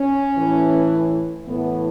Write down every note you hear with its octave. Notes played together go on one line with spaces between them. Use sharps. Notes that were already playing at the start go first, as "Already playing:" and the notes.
Already playing: C#4
A2 E3
A2 E3 B3